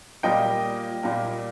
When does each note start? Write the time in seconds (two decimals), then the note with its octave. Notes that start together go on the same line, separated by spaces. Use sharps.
0.23 A#2 G3 A#3 D#5 G5
1.03 A#2 G3 A#3